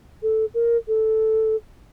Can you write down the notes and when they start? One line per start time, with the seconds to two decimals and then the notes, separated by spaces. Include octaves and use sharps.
0.23 A4
0.54 A#4
0.88 A4